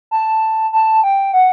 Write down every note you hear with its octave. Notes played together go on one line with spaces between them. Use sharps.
A5
A5
G5
F#5